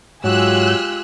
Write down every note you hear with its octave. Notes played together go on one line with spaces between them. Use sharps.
G#2 F#3 G#3 F4 G4 G#5 E6 F#6